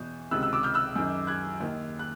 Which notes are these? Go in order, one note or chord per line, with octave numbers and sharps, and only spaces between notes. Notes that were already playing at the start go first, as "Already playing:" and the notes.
Already playing: E2 B2 G6
C#2 C3 D#3 E6 F#6
E6 F#6
D6 E6
F6 G6
E6 F#6
F#2 D#3
F#6 G#6
D#2 D#3
F#6